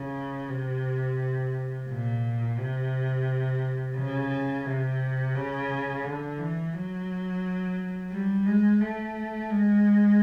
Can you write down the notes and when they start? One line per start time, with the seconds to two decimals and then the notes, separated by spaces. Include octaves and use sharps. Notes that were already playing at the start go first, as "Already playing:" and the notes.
Already playing: C#3
0.49 C3
1.88 A#2
2.58 C3
3.96 C#3
4.65 C3
5.35 C#3
6.04 D3
6.38 E3
6.73 F#3
8.11 G3
8.46 G#3
8.82 A3
9.50 G#3